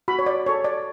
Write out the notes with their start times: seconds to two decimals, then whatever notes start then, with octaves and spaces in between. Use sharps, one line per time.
0.08 F#4 B5
0.19 C#5
0.26 D5
0.46 A4 C#5
0.64 D5